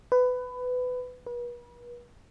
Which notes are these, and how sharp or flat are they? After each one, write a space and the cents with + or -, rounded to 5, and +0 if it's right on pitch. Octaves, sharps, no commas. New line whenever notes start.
B4 +20
B4 -40